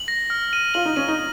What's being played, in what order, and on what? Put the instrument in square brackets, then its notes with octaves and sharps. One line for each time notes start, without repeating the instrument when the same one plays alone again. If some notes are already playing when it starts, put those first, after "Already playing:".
Already playing: [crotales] F#7
A#6
F6
D#7
[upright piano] F4 [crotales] F#7
[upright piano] D#4
[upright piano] C#4 [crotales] D#7
[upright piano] D#4